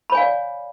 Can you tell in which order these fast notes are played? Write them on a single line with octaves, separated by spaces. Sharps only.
B5 C#5 G#5 F5 D5